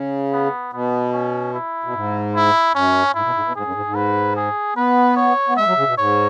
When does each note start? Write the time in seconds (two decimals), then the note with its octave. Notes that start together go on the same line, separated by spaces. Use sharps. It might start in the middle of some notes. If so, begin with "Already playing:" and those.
Already playing: C#3
0.33 B3
0.73 B2 B3
1.13 C#4
1.53 E4
1.84 B2
1.94 G#2
2.35 E4
2.75 F#2 C#4
3.14 G#2 E4
3.24 B2
3.34 G#2
3.45 B2
3.55 G#2 G#4
3.65 F#2
3.75 G#2
3.86 G#2
3.95 B4
4.36 G#4
4.76 B3 B4
5.16 C#5
5.48 B3
5.57 G#3 E5
5.66 F#3
5.77 C#3
5.87 B2
5.98 G#2 C#5